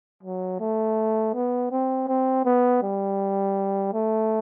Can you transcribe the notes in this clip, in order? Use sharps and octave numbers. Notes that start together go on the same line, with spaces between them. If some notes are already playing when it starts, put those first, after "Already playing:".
F#3
A3
B3
C4
C4
B3
G3
A3